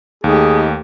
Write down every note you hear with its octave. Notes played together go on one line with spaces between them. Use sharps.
D#2 A3 D#4 G4 G#4